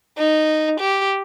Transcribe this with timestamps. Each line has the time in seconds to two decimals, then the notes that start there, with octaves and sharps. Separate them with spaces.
0.18 D#4
0.80 G4